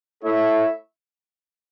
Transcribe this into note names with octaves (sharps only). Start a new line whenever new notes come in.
A3 E4 A4 C#5 E5